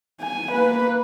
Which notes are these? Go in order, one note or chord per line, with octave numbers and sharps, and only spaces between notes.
G#5
A#3 B4